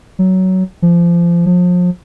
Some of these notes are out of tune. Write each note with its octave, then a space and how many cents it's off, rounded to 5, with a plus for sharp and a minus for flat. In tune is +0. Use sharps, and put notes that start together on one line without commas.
F#3 +15
F3 -25
F3 +35